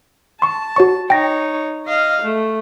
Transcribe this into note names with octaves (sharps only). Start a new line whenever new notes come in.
A5 C6 C#6
F#4 C#5 C#6
D#4 C#5 G5 A#6
D#5 F5
A3